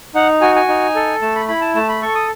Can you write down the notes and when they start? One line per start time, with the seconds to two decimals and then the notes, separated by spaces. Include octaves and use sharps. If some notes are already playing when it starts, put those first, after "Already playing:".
0.15 D#4 F#5
0.41 F#4 G#5
0.56 G#5
0.68 D#4
0.95 A4
1.22 A3 A5
1.36 B5
1.48 E4 B5
1.61 A5
1.75 A3 A5
1.89 B5
2.02 A4 C#6
2.15 D#6